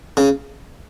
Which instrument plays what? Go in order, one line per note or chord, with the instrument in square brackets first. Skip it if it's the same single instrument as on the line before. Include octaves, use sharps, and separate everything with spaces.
[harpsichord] C#3